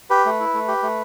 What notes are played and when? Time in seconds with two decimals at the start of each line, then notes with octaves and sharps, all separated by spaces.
0.10 G4 B4
0.25 A3
0.40 E4
0.54 A3
0.68 G4
0.83 A3